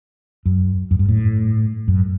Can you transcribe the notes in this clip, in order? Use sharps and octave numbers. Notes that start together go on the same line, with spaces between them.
F#2
F#2
G2
A2
F#2